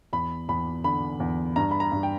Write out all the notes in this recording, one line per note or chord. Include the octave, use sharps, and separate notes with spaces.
E2 B5
E2 B5
D3 B5
E2
G2 A#5
B5
A#5
G2
G5